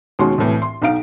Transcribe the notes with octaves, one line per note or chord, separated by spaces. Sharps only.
D#2 B2 G#3 C#4 F#4 C6
C2 A2 E3
C6
B1 D#4 F5 D7